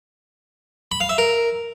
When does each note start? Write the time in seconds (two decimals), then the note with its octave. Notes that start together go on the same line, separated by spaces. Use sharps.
0.92 B5
1.00 F5
1.09 E5
1.18 A#4